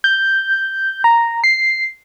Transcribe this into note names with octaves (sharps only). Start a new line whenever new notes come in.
G6
A#5
C7